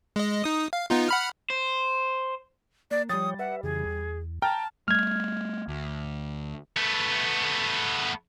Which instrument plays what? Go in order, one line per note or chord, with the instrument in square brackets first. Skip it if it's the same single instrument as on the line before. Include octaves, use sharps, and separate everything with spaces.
[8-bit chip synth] G#3 D#5
D#4 D#6
F5
B3 D#4 F4
F#5 B5 F6
[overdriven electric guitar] C5
[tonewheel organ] A#3 [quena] D5
[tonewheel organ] F3 C#5 G5 [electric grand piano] G3 A6 [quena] D#6
[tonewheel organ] B4 E5 [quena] F#5
[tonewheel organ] F2 C#3 E3 [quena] G#4
[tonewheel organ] E2
[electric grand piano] G5 A#5 F6 [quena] A5
[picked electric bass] G3 A3 [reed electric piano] F6 G#6
[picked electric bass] D2
[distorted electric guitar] A3 B3